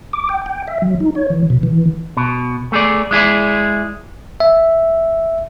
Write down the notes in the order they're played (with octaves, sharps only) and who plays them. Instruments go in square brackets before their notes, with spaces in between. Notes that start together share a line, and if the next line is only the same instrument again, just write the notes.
[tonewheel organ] D6
G5
G5
E5
F#3
D#4
C#5
E3
B2
E3
[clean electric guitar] B2
A3 G#4 D5
G#3 E4 G#4 D5
[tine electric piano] E5